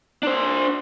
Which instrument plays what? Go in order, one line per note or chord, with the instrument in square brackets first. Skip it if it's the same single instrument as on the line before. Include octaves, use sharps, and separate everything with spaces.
[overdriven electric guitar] D4 C5